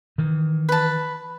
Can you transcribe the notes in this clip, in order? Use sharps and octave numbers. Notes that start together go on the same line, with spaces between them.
D#3 E3
B4 A5